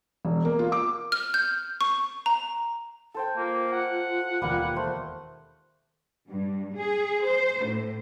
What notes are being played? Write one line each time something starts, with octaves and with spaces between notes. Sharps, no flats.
E1
A#3
F4
D6
F6
G6
C#6
A#5
A4 C5 G5
A#3 F4
F#5
E1 D#2 G3 A#3 B4
A3 C5 C6
G2
G#4
C5
A2